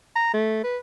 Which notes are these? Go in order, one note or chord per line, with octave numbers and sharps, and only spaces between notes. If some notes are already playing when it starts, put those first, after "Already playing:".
A#5
A3
B4